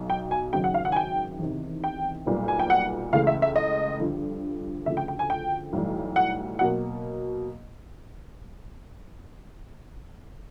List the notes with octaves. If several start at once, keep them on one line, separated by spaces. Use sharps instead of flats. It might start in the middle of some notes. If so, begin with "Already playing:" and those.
Already playing: B1 B2
G5
G#5
G#1 F#2 C#3 F#3 G5
F#5
F5
F#5
G#5
G5
E2 C3 D#3
G5
B1 A#2 G3 B3
G#5
G5
F#5
C#2 C#3 E3 A3 F5
E5
E5
D#5
G2 D3 F3
D2 C#3 F3 A3 E5
G5
G5
G#5
G5
B1 A2 E3 G3
F#5
B2 F#3 A#3 F#5